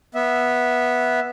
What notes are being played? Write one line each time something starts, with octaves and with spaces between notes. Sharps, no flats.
B3 E5